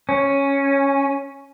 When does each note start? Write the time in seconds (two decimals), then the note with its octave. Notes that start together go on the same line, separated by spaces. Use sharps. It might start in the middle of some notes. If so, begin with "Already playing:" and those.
0.09 C#4